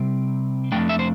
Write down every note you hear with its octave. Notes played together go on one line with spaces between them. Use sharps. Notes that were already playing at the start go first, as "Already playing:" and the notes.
Already playing: C3 G3 C4
F2 E3 A3 D4 G5
E5
C5